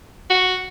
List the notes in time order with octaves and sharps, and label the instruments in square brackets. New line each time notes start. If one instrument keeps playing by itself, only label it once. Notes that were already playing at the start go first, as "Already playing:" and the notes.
[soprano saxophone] F#4